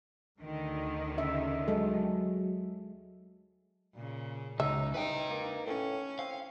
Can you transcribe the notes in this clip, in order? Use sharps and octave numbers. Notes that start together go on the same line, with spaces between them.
D2 D3 D#3
C#3 E5
F#3 G#3 A4
A#2 C#3
C#2 F#3 D#4 E5
C2 D#4 B4 G5
A#3
A2 C#4
C4 F5